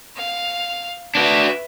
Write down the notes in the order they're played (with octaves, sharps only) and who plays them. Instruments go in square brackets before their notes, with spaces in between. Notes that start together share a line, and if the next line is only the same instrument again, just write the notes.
[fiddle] F5
[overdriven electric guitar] D4 F#4 [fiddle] B4 E5